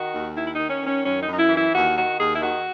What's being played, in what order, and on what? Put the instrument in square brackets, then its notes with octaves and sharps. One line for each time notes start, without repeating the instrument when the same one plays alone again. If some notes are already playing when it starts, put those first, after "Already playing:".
Already playing: [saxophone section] D#3 F#4
D#2
D#3 E4
E4
D#4
D#3
C#4
D#3
C#4
F#2 C#4
D#4
F#2
D#4
E4
E3
E4
D#2 F#4
D#3 F#4
D#2 G#4
E4
D#3 F#4